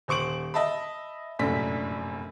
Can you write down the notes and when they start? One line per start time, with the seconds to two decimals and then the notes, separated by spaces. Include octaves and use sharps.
0.08 D#1 C5 C#6 D7 F#7
0.54 D#5 E5 A5 B5
1.39 F1 A#1 F#2 A2 D4 B6